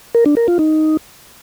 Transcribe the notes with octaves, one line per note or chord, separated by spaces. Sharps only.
A#4
D4
A#4
F4
D#4